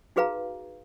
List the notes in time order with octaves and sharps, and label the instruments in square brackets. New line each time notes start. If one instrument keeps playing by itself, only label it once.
[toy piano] D#4 F#4 G#4 B4 F5 A#5